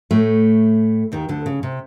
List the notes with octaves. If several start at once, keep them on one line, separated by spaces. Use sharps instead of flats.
A2 A3
D#2 D#3
D2 D3
C#3
C3